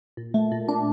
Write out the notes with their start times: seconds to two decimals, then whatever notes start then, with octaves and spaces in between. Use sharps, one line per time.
0.17 A#2
0.34 A3
0.52 A#2
0.68 D4